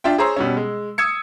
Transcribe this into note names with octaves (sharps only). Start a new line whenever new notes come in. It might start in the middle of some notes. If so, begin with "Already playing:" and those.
D4 F4 E5 G5
G#4 C5 C#5 A#5 C6 E6
B2 G3 C#4
G#3
D#6 E6 G#6 C#7